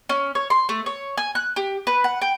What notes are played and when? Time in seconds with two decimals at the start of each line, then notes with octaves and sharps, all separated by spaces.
0.09 C#4
0.35 C#5
0.50 C6
0.69 A3
0.86 C#5
1.18 G#5
1.35 F#6
1.56 G4
1.87 B4
2.04 F#5
2.22 G5